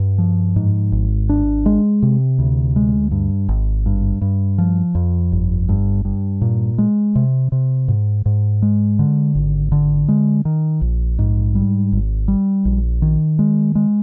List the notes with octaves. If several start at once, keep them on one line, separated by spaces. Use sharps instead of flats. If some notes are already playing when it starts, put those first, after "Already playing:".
Already playing: G2
F3
G#2
G#1
D4
G#3
C3
D2
G#3
G2
G#1
G2
G2
F3
F2
G1
G2
G2
A#2
G#3
C3
C3
G#2
G#2
G#3
D3
G#1
D3
G#3
D#3
A#1
G#2
G3
G#1
G3
A#1
D#3
G#3
G#3